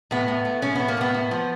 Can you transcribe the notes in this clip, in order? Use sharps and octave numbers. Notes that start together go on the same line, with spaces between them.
A2 B3
A2
A3
A2 C#4
A2 B3
A#3
A2 B3
A2
F3